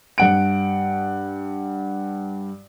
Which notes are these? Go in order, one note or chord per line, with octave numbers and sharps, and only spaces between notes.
G2 F#5 D7